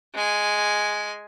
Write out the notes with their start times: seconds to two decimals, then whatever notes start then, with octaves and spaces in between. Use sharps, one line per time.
0.14 G#3 G#5